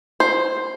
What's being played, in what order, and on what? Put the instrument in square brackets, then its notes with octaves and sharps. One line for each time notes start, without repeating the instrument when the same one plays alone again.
[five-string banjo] C5